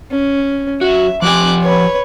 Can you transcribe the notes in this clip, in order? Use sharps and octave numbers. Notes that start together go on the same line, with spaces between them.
C#4
F#3 F#4 E5
F3 G4 G#5 D6 F#6
B4 C#5